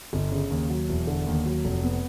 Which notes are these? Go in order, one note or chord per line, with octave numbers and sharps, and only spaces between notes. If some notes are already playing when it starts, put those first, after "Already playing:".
G1
C#3
D#2
F#3
E1
D3
D#2
F#3
F1
B3